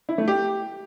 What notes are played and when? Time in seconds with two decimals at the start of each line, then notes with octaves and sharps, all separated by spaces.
0.09 E4
0.18 A3
0.28 G4